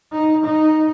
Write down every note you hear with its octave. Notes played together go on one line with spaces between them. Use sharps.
D#4
D#4